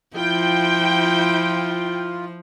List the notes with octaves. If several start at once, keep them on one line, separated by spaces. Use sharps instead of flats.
F3 E4 F4 G5